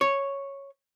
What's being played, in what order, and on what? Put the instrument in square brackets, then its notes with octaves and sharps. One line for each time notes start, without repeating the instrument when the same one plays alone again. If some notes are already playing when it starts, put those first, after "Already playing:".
[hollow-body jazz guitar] C#5